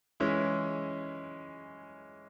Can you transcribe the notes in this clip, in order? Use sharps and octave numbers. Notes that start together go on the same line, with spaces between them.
E3 G#3 C#4 E4